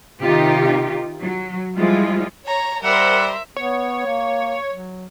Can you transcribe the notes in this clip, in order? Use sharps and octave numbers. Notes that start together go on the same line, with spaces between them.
C3 D#3 D#4 F4 G4
F#3
F3 G3 G#3 E4 F4
C#5 A#5
G3 A#4 C5 E5 F#5
B3 C#5
A#3
F#3